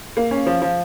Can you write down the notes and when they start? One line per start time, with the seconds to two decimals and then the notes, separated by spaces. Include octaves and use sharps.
0.17 A#3
0.31 C#4
0.46 F3
0.62 F3